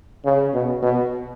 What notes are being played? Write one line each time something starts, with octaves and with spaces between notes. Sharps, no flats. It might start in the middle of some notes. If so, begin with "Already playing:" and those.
C#3
B2
B2